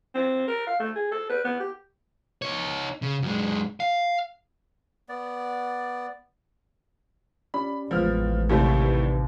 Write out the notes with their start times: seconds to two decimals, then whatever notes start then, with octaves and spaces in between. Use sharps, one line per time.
0.15 C4
0.48 A#4
0.67 F5
0.80 A3
0.96 G#4
1.11 A4
1.30 B4
1.44 B3
1.60 G4
2.42 D#4 C#5
3.02 C#3
3.22 F#2 G#3
3.80 F5
5.09 B3 D5
7.54 C#4 G4 D5 B5
7.91 A1 E2 F3 G#3 B3 F6
8.49 D#2 A2 C3 G3 A3
8.84 D#4 G4 B4